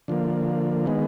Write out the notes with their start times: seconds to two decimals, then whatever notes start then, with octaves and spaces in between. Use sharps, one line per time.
0.08 D3 F3 A#3
0.86 D#3 G#3 B3